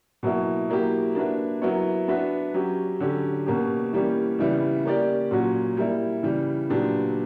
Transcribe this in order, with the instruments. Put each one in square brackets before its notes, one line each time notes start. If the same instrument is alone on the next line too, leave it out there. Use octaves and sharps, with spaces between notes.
[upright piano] B2 F#3 A#3 E4
F#3 A#3 E4 G4
A#3 D4 F#4 B4 E5
F#3 B3 E4 A#4 C#5
B3 D4 F#4 B4 E5
F#3 C#4 G4
D3 F#3 C#4 G4
B2 A#3 C#4 G4
E3 G3 A#3 C#4 G4
C#3 E3 G3 B3 E4
A#3 C#4 G4 A#4 D5
A#2 F#3 C#4 F#4
G3 A#3 E4
C#3 E3 G3
A#2 F#3 B3 D4 G4